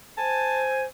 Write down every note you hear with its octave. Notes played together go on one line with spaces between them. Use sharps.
C5 G#5 A5